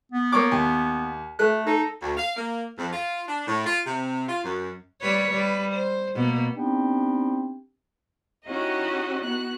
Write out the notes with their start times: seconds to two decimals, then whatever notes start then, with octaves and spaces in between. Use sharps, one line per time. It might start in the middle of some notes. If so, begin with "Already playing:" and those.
0.12 B3
0.32 A#3 C#5 D6
0.52 D#2
1.39 A3 F#6
1.67 D#4 A4
2.02 D2
2.17 F5
2.36 A#3
2.77 F2
2.93 F4
3.27 D4
3.47 A2
3.65 F4
3.85 C3
4.28 F4
4.43 F#2
5.01 G3 B4 C#5
5.31 G3 B4
5.74 C5
6.15 B2 A#3
6.55 B3 C4 D4 D#4 G4 G5
8.47 C#4 D#4 E4 F#4 G4 D#5
9.24 B3 F#4 F#6